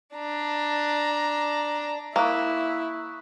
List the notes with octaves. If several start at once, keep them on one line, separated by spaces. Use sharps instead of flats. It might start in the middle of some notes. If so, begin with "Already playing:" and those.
D4 A#5
A#3 E4 C#6 D#6 F#6